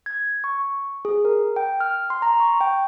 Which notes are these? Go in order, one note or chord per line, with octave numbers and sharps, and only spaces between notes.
G#6
C#6
G#4
A#4
G5
F6
C6
A#5
C#6
G5